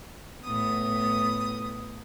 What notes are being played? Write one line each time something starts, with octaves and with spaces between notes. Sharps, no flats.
A2 B3 D#6